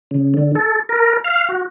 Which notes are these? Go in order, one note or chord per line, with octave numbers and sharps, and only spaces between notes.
C#3
D3
A4
A#4
F5
F#4